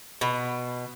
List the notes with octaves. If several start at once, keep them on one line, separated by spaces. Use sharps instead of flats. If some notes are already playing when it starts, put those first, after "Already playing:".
B2